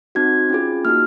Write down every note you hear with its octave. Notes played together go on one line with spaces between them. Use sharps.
C4 D#4 F#4 G#6
C#4 F4 G#4
A#3 D#4 F#4 F6